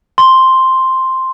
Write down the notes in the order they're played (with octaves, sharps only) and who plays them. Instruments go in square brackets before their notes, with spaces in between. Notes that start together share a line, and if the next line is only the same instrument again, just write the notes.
[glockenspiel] C6